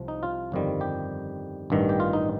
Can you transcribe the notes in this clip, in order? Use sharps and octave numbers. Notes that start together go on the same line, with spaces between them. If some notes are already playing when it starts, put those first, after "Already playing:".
Already playing: C2 C3 F3
D#4
F4
G1 F2 D#3 G3
G4
A1 G2 D#3
G4
F4
D#4